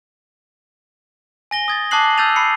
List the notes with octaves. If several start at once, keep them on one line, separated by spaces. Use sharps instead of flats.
G#5 A#6 G7
D#6 G#6 A6
A5 D6 D#6 F#6 C7 F#7
E6 F#6 G6 A6 D#7 F7
B5 C7 C#7